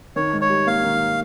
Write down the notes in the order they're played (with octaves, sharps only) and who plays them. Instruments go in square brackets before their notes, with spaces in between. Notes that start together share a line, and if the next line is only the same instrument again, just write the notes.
[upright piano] D#3 [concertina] C#5
[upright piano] G#2
[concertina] C#5
[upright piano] G3
[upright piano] A#3 [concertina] F5
[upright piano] D#3